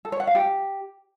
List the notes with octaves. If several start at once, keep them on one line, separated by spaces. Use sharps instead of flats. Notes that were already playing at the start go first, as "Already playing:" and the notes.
A4
C#5
F#5
F5
G4